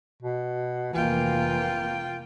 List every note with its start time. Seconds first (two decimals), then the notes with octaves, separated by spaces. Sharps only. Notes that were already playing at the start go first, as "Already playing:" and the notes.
0.22 B2
0.94 F1 E3 A#3 F4 G5